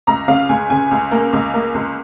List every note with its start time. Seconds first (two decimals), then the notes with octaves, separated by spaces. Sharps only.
0.07 C#2 A#5
0.28 C#3 F5
0.49 C#2 G#5
0.70 C#3 G#5
0.91 C#2
1.11 A#3
1.33 C#2
1.54 A#3
1.74 C#2